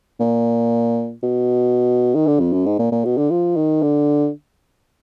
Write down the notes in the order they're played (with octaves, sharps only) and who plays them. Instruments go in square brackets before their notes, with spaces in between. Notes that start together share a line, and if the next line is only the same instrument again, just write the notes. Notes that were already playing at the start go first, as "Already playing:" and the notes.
[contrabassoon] A#2
B2
D#3
D3
F2
F#2
G#2
A#2
A#2
B2
D3
F3
D#3
D3